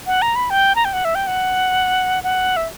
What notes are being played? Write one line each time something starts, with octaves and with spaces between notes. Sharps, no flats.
F#5
A#5
B5
G5
A#5
G5
F#5
E5
G5
F#5
F#5
E5